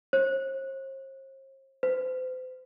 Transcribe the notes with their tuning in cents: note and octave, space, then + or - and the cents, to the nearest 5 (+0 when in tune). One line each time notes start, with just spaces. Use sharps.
C5 +45
C5 -40